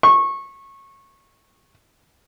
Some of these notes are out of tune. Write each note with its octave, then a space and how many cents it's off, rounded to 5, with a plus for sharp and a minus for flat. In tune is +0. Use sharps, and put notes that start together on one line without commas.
C#6 -20